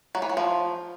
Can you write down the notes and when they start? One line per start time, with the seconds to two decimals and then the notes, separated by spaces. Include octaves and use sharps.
0.15 F#3
0.22 E3
0.29 F#3
0.37 F3